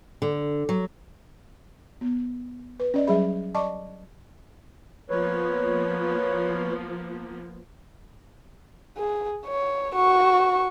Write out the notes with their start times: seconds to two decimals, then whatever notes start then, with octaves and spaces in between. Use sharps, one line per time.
0.22 D3
0.69 F#3
2.01 B3
2.80 B4
2.94 C#4 D5 D#5
3.07 F#3 G3 C#4 G#4 E5 B5
3.54 D5 D#5 A5 C#6 D6
5.10 F3 A#3 B3 B4 C#5
8.98 G#4
9.46 C#5
9.95 F#4 C#6